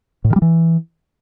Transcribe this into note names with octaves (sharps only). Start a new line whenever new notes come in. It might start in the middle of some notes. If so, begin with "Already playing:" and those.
A2
D#3
G3
E3